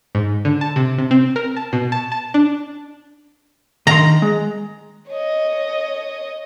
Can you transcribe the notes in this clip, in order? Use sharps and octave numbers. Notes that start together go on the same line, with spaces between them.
G#2
D3
A5
C3
C3
C4
A#4
A5
B2
A5
A5
D4
D#3 F5 A#5 C6
G#3
C#5 D#5